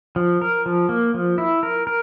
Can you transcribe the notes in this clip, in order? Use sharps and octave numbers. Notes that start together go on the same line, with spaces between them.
F3
A#4
F3
A#3
F3
E4
A#4
A#4